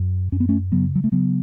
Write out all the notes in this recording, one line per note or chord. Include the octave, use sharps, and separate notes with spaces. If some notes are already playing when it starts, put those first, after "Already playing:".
Already playing: F#2
F#2 C#4
B3
A3 C#4
C#3 F#3 B3
F#3
A3
C#3 F#3 B3